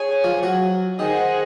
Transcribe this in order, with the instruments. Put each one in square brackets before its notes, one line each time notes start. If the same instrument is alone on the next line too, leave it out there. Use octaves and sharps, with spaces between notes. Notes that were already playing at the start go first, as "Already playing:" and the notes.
Already playing: [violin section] G#4 C#5 G#5
[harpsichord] F3 F4
F#3 F#4
[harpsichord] D#3 D#4 [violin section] G#4 C5 D#5 F#5